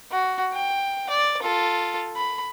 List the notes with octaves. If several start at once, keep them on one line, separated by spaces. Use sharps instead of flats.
F#4
G5
D5
F4 A4
B5